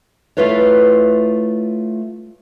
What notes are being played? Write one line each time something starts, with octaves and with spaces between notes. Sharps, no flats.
A3 E4 F4 B4 C#5